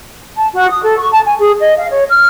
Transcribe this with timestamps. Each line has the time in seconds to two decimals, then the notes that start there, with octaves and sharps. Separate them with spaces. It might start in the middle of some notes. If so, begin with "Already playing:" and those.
0.34 A5
0.54 F#4
0.69 D#6
0.82 A4
0.97 C#6
1.12 A5
1.25 G#5
1.39 G#4
1.59 D#5
1.76 F5
1.89 C#5
2.10 F6